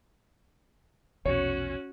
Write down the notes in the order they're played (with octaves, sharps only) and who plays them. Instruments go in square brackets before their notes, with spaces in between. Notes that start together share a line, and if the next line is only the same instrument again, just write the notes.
[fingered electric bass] A#1 E2 B2 [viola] C#4 F#4 [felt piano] C#5